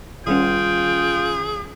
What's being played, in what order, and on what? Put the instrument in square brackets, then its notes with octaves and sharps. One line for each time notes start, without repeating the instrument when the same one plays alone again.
[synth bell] D#3 G3 C#4 [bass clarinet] F4 [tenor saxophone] G#4 [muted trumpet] G5